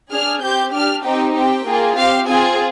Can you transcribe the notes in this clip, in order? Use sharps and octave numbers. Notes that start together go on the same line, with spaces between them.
D4 G#4 F6
C4 G4 G6
D4 G4 F6
C4 D#4 G4 G5
C4 G4 G5
A#3 F4 G#4
C4 G4 F5
C4 F4 G#4 G#5